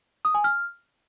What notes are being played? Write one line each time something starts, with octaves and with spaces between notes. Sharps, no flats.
D#6
G#5
F6